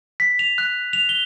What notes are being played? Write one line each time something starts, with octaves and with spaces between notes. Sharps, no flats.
B6
F7
F#6
F7
G7